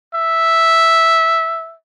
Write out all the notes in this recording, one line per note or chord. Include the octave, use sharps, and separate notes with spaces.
E5